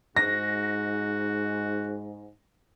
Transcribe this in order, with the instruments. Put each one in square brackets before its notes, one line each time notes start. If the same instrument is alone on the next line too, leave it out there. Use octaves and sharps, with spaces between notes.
[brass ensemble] G#2 [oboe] F#4 [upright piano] A#6